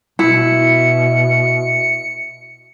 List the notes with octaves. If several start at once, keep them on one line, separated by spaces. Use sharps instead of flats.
B2 E4 C#7